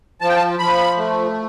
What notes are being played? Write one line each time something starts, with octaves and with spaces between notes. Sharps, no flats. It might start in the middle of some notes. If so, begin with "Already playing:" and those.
F3 A5
G5
A5
F3 B5
A3